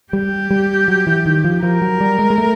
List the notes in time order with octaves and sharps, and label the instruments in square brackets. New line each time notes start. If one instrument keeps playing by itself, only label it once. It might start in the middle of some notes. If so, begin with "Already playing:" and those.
[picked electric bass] G3 [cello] G4
[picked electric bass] G3
F#3
E3
D#3
F3
[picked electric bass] F3 [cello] A#4
[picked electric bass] F#3
G3
G#3
G#3
A3